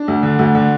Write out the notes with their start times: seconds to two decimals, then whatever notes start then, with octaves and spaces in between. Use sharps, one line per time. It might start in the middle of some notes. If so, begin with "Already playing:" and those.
Already playing: D4
0.08 D2
0.23 D3
0.39 D2
0.55 D3